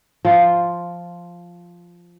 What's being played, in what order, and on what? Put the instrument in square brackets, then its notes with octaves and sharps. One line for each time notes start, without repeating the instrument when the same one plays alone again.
[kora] F3 F4